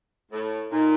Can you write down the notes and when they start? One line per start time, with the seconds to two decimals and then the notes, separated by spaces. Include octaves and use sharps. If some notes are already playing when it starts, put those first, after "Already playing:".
0.32 A2
0.72 A#2 D#4